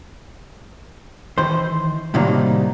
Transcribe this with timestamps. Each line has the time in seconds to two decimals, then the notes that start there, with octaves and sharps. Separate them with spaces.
1.38 D#3 E3 C5
2.14 A2 C3 D#3 F#3 G3 A#3